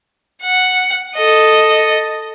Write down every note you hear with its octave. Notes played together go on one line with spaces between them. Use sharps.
F#5
A4 D#5